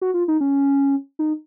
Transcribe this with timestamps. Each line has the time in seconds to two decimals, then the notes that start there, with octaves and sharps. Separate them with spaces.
0.01 F#4
0.14 F4
0.28 D#4
0.41 C#4
1.19 D#4